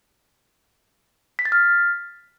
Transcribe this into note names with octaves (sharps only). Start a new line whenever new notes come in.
B6
A6
F6